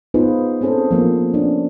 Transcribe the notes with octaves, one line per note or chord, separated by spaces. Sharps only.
B3 D#4 F4 G#4 B4 C5
C4 C#4 G#4 A4 C5
F3 A#3 B3
C#4 D4